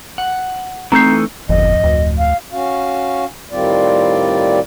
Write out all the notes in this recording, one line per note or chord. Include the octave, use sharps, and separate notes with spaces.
F#5
E3 A3 C4 D#4 A4 A#5 G6 C7
D1 G1 F2 D#5
D2
F5
C#4 F#4 F5
A2 D#3 G3 C4 F4 D5